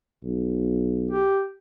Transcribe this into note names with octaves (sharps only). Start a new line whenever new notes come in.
B1
G4